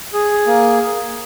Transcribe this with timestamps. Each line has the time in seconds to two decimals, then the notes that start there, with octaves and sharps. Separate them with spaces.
0.13 G#4
0.47 A#3